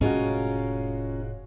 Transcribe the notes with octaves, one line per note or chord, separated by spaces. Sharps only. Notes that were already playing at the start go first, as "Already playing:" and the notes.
F1 A2 G#3 C#4 F4 F#4 A#4